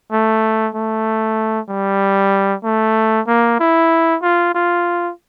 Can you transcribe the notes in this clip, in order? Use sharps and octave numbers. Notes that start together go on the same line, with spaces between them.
A3
A3
G3
A3
A#3
E4
F4
F4